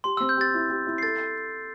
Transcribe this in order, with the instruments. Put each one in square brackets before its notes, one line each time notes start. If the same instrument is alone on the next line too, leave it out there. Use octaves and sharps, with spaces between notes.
[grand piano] G4 [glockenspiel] C6
[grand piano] C4 [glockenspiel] E6
[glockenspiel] G6
[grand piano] G4 [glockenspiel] A6
[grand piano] E4
G4
E4
[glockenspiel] C7
[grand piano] A4 [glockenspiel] A6